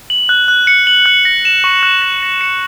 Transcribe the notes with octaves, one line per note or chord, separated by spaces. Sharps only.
F#7
F#6
F#6
C#7
F#7
F#6
A#6
E7
C#6
F#6
A#6
A#6
C#7